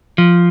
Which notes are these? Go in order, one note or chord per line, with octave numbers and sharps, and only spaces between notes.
F3